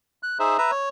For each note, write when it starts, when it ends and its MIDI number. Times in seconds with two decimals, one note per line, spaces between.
0.23 0.38 90
0.39 0.57 63
0.39 0.57 68
0.39 0.57 72
0.39 0.57 76
0.58 0.71 71
0.58 0.71 76
0.58 0.71 82
0.71 0.89 73